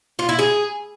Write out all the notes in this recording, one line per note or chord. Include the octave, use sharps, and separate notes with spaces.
F4
E4
G#4